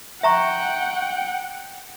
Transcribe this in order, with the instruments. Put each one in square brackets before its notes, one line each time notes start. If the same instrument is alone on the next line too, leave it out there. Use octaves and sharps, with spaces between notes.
[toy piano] E5 A#5 C#6 [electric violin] F#5 G5